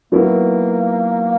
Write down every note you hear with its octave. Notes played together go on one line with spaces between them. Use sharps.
D#3 F#3 A#3 B3 E4